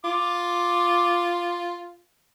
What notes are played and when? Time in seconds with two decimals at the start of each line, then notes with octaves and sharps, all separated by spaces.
0.04 F4 D6